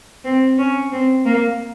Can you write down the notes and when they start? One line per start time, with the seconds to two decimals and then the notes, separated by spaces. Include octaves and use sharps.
0.24 C4
0.58 C#4
0.92 C4
1.25 A#3